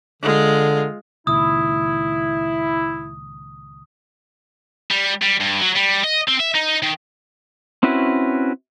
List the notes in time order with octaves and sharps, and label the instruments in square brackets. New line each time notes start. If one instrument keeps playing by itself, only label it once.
[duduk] D3 [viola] G#3 F4
[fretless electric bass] C#2 A#2 D#3 [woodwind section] E4 [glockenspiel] D#6
[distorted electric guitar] G3
G3
G2
F#3
G3
D#5
C4
E5
D#4
D#3
[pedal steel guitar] C4 C#4 E4 F#4 B4